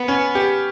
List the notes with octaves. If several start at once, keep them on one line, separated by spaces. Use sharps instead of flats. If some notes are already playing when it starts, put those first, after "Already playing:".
Already playing: B3
C#4
G4